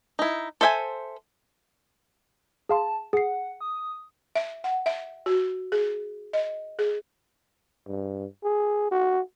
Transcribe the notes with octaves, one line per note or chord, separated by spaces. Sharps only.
D#4 E4
A4 C5 E5 G5 G#5
G#4 F5 A5 C6
G#4 F#5 C7
D#6
E5
F#5
E5
F#4
G#4
D#5
G#4
G2
G#4
F#4